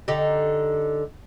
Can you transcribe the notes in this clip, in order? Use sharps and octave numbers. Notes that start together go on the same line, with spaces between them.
D3 D#4 G4